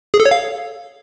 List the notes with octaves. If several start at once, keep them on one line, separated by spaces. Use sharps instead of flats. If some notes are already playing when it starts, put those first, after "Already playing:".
G#4
A4
C#5
F5